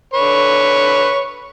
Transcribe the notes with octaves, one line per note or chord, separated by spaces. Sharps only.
D3 B4 C#5